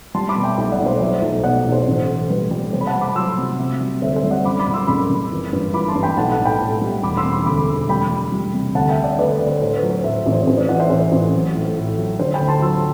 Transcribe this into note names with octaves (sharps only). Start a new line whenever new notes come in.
G3 A5 C6
B5 D6
B2
E5 G5
B1 E5 G5
D5 F#5
B1
C5
F#3 C5 E5
B1
B2 D5 F#5
B1
C5
A1
A2
G3 B4
G3
C3 C5
B5
F#5 A5
C3
B5 D6
F#3 C6 E6
C3
C3
G3
D2 C5 E5
C5
G3
D5 F#5
F#2 B5 D6
B5 D6
F#1
C6 E6
F#1 B5 D6
F#1
E3
G2
E3 B5 D6
A5 C6
G2
G5 B5
B1 F#5 A5
F#5 A5
A2
G5 B5
A2
G3
E1 B5 D6
C6 E6
E1
B5 D6
D2 B5 D6
E1
G3 G5 B5
G3
G3
C3
D2 F#5 A5
E5 G5
D2
D5 F#5
D2 B4 D5
B4
D2
C5
A2 C5
B4
F#3
C5
A2 C5 E5
A1
C5
A1 C5
B4 D5
E3 D5 F#5
C5 E5
A1 C5
A1
F#3
A2
A2
F#3
D3 C5
G5 B5
D2
A5 C6
F#3 C6 E6